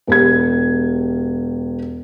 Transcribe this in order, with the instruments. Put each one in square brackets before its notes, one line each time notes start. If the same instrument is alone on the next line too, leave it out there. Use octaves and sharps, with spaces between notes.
[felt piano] E1 G4 G#6